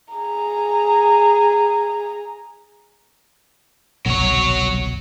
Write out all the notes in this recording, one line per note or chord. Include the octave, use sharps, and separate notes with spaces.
G#4 A#5
G1 C2 B2 F#3 C#5